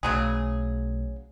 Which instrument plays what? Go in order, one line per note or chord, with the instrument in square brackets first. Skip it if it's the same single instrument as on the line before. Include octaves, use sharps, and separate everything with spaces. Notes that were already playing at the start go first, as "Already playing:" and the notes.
[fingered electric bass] B1 A3 [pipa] C#3 F#3 G#4